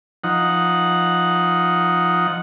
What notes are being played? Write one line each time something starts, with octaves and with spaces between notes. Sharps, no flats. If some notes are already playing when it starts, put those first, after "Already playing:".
F3 D#4 F#5